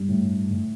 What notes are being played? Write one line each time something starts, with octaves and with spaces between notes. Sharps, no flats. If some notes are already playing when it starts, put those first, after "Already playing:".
Already playing: G2
A2
A2